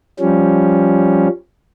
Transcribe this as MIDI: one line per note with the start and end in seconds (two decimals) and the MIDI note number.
0.20 1.28 53
0.20 1.28 55
0.20 1.28 61